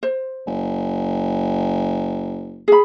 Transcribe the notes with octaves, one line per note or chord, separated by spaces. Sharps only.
C5
F#1
G#4 B5